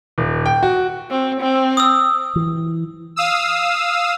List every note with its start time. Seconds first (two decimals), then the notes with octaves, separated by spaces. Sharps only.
0.18 D#1
0.46 G5
0.63 F#4
1.10 C4
1.41 C4
1.77 D#6 E6
2.36 E3
3.16 F5 D#6 E6